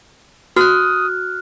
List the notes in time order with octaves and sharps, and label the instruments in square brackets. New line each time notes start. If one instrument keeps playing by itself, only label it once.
[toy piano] F#4 [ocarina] D#6 [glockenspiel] F6 F#6